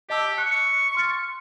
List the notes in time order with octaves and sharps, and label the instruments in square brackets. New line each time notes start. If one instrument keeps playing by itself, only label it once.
[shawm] G4 [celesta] D#5 A5 E6
[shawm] C#6 [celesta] F#6
[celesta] C6 F6 A6